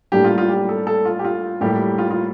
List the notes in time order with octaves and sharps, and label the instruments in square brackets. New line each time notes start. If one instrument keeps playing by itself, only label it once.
[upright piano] A2 G3 A#3 D4 [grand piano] G4
[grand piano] F4
F4
G4
A4
A4
F4
G4
F4
[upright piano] A2 G3 A#3 [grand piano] G4
[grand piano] F4
F4